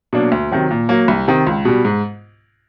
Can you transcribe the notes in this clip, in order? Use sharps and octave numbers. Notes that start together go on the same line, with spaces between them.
B2 F#3 A#3 D4
D2
C3 D#3 F#3
A#2
F#3 A#3
C2
C3 D#3
C#2
B2 G3
G#2